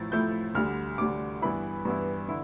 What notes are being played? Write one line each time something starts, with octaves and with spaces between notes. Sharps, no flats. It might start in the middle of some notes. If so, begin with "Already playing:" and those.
Already playing: A2 F3 A3 E4 A6
A2 F3 A3 E4 G6
D2 D3 G3 F6
D2 D3 G3 D6
G2 E3 B3 E4 B5
G2 E3 B3 E4
D3 E4